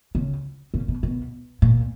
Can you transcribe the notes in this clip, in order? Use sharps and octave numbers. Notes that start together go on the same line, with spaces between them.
C#3
C#3
B2
B2
A#2